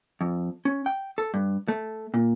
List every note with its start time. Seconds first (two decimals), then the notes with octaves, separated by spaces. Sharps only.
0.21 F2
0.65 C#4
0.86 G5
1.18 A4
1.34 G2
1.68 A3
2.14 A#2